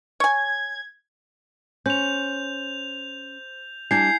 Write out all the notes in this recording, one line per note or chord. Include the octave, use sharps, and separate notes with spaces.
C#5 G#5 G#6
C#4 C5 G6 F7
G3 D4 E4 G#5 G6 G#6 C7